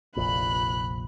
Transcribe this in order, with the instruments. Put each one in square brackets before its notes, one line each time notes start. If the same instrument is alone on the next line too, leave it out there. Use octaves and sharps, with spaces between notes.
[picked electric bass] F1 A#1 A#2 [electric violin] B5 F#6